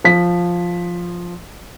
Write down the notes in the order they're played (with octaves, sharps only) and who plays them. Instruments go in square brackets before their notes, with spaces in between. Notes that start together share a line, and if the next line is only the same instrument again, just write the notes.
[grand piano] F3 B6